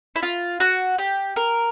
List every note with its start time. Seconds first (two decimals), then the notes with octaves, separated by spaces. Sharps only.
0.16 E4
0.23 F4
0.60 F#4
0.98 G4
1.36 A#4